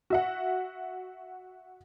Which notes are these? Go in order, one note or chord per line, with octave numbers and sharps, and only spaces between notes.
F#4 E5 F#5